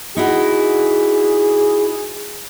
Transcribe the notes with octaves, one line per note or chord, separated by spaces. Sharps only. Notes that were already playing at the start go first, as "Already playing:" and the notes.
D#4 E4 F#4 G#4